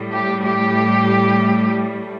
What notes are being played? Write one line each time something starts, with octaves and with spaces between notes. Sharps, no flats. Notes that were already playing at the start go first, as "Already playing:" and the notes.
Already playing: A2 G3
G4
G4